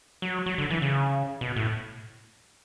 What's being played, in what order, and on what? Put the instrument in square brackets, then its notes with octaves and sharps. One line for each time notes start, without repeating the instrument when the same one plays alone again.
[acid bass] F#3
F#3
D3
E3
C#3
B2
A2